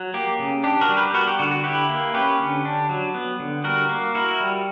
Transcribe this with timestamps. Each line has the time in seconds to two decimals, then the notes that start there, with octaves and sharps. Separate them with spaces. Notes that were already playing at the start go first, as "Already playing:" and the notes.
Already playing: F#3
0.14 A#3 G4
0.39 C#3
0.64 D4 G4
0.81 F#4 A#4
0.89 G3
0.97 G4 B4
1.14 B3 F#4 A#4
1.27 G4
1.39 D3 F#4
1.51 F#4
1.64 E4 G4 B4
1.89 A#3
2.14 C#4 G4 B4
2.39 D3
2.65 D4
2.89 F#3
3.14 B3
3.40 D3
3.64 G3 F#4 A#4
3.89 A#3
4.15 E4 F#4 A#4
4.40 G3